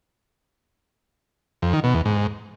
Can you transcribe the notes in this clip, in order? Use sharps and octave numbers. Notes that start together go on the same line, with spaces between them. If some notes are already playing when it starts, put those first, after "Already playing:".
F2
D#3
B2
E2
G#2